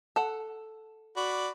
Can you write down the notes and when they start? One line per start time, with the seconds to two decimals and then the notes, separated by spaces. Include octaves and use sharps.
0.16 A4 F#5
1.16 F#4 D5 B5